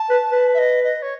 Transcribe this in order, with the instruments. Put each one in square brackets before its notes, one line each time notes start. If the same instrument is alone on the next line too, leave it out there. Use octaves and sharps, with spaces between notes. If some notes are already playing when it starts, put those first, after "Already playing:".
Already playing: [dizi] A5
[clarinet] B4
B4
[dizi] E5
D#5
D#5
C#5